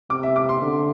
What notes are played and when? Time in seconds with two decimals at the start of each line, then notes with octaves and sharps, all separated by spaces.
0.10 C3 D6
0.23 E5
0.36 D6
0.49 C6
0.62 D3